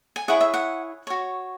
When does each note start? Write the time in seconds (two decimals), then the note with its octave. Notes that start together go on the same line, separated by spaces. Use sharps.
0.16 G#5
0.28 E4 G#4 C#5 F#5
0.41 E5
0.54 F#5
1.07 F#4 C#5